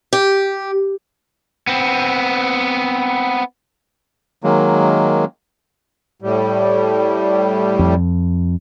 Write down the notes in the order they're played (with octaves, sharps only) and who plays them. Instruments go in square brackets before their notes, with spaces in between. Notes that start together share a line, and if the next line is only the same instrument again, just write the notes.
[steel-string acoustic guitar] G4
[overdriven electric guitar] B3 C4
[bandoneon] D#3 F#3 G#3 A#3
[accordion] A2 G3
[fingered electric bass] F2